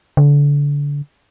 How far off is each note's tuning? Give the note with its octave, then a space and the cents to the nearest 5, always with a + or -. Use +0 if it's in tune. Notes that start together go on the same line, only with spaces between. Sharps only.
D3 -30